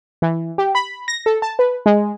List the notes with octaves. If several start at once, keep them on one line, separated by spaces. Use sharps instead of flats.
E3
G4
B5
A#6
A4
A5
B4
G#3